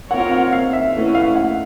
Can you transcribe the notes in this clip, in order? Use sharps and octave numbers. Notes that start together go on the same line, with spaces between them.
C4 F4 A#4 C#5 F#5
F#5
F5
E5
E3 A3 C#4
F5
F#5